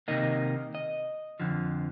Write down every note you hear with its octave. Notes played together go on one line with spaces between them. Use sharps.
C3 D#3 A#3 D#5
D#5
F2 D3 F3